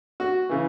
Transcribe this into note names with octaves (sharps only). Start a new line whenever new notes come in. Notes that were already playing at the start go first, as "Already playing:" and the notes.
F#4
C#3 E3